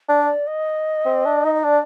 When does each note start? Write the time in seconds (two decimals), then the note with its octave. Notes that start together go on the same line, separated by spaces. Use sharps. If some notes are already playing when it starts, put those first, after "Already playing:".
0.09 D4
0.18 D5
0.47 D#5
1.06 C4
1.25 D4
1.44 D#4
1.55 D#5
1.64 D4 D5